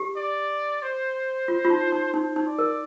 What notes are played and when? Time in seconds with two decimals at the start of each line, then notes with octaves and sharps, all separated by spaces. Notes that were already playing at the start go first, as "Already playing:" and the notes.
Already playing: G4
0.16 D5
0.82 C5
1.48 F4
1.65 F4
1.70 D#4
1.92 D#4
2.14 D#4 C5
2.36 D#4
2.47 D5
2.59 A#4